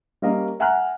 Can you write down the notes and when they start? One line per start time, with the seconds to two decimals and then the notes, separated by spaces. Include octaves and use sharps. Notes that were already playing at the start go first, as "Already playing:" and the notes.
0.22 G3 A#3 C#4 A#4 D#5 F5
0.60 E5 F#5 G#5 A#5 F6 F#6